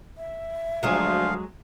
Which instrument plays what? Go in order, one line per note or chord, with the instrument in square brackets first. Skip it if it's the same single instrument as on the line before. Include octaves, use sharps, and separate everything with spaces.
[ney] E5
[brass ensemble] D2 D3 F3 [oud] F#3 G#3 G#4 [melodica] F5